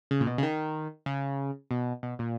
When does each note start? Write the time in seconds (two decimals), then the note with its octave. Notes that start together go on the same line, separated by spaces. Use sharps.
0.11 C#3
0.21 A#2
0.27 B2
0.38 C#3
0.43 D#3
1.06 C#3
1.71 B2
2.03 B2
2.19 A#2